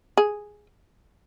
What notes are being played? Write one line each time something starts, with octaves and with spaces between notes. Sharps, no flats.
G#4